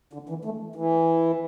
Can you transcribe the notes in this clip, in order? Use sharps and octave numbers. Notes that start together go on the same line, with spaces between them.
D3
E3
A3
E3